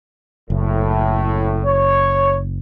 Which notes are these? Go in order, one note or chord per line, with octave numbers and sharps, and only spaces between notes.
F#1 A2
C#5